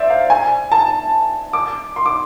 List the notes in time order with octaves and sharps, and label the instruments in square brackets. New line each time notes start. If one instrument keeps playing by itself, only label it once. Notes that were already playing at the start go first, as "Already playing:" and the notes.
Already playing: [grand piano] C5 D5 E5
F5
G#5
A5
D6
C6
D6